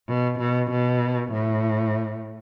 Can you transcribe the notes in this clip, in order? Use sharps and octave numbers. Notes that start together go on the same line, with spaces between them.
B2
B2
B2
A2